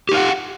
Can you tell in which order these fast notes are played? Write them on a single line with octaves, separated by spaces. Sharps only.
G4 D#4 F5 F#5